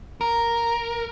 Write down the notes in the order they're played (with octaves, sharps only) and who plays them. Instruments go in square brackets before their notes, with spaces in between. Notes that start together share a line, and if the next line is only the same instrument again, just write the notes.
[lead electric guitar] A#4